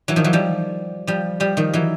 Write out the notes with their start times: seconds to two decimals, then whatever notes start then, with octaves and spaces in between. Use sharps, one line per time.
0.08 E3 F#3
0.16 D#3 F3
0.24 E3 F#3
0.33 F3 G3
1.07 F3 G3
1.40 F3 G3
1.57 D#3 F3
1.74 E3 F#3